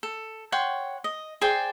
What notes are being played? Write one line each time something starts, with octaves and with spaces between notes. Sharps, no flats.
A4
C#5 F#5 G5 C6
D#5
G#4 C5 D5 G5